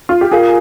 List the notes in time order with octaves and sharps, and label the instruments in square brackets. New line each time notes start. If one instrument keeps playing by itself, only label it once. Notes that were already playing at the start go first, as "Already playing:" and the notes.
[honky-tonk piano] F4
G4
[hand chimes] F4 A#4 F5 [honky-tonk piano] G#4